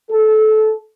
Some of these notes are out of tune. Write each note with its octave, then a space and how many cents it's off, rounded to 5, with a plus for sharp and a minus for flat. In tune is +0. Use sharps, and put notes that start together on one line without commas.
A4 -20